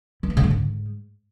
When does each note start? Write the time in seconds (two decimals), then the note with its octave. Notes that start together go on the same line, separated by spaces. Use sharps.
0.23 E3
0.30 A3
0.37 C#3
0.44 D3
0.50 G#2